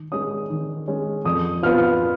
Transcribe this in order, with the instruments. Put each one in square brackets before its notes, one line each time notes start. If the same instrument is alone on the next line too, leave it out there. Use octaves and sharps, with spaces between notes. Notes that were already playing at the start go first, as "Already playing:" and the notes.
Already playing: [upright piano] D#3
G#3 C#4 D#6
D#3
G#3 C#4
F2 D#6
F3 B3 F4 F6